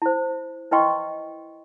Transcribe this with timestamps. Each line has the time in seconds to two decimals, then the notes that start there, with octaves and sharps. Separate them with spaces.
0.02 E4 C5
0.71 E4 B4 D#5 G5 C6 C#6